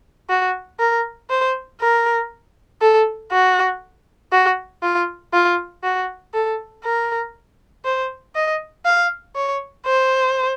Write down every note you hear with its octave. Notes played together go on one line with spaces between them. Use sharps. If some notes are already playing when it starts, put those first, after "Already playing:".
F#4
A#4
C5
A#4
A4
F#4
F#4
F4
F4
F#4
A4
A#4
C5
D#5
F5
C#5
C5